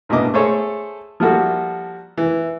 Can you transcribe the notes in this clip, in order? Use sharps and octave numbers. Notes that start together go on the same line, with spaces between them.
A1 G2 B2 A#3 D#5 D6
A3 G#4 A4 C5 C#5
F3 G3 A#3 E4 F#4 A4
E3